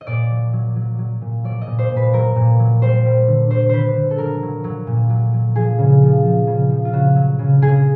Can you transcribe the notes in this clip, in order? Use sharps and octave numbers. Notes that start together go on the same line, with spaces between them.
D#5
A#2 D5
F#3
F#3
F#3
F#3
A#2
F#3 D5
D#5
A#2
C5
A#2
B4
F#3 A#4
A#2
F#3
G3 C5
G3
D3
D3 C5
D3 B4 C5
D3
A4
F#3 A#4
F#3
F#3
A#2
F#3
F#3
F3 G#4
C#3
F3
F3
C#3
F3
F4
C#3 F#4
F#3
C#3
C#3 G#4